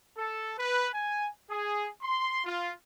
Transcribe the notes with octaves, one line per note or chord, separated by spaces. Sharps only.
A4
B4
G#5
G#4
C6
F4